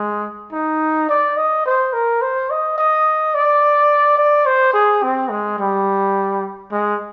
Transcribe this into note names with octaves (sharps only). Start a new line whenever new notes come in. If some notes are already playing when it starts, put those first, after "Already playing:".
Already playing: G#3
D#4
D5
D#5
C5
A#4
C5
D#5
D#5
D5
D5
C5
G#4
C4
G#3
G3
G#3